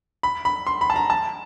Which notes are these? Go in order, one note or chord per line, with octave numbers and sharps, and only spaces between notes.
B5
B5
C6
B5
A5
A#5
A5